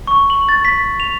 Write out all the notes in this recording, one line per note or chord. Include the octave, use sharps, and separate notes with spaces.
C#6
F#7
A6
B6
F7